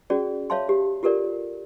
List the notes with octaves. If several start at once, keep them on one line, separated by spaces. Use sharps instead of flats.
C#4 F#4 G#4 D5
C#5 E5 F5 A5 C6
G4
F4 G4 A4 A#4 D5